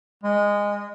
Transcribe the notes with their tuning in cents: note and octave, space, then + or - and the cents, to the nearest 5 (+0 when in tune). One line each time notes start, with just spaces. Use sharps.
G#3 -15